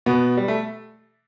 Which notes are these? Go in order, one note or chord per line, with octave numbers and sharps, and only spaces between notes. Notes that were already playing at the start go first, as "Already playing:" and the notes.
B2 B3
G3
A3